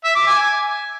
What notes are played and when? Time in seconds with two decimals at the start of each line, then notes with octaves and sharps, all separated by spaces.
0.04 E5
0.16 D6
0.27 G#5